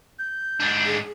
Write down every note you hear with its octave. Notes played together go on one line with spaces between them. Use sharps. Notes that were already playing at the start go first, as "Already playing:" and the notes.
G6
G#2 D4
G#4